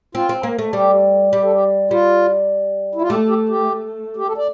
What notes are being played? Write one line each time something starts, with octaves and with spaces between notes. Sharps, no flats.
C4 F4
C4
A#3
A3
G3 G4
G3 G4
A4
G4
G3 F4
E4
F4
A3 G4
G4
G4
G4
A4
D5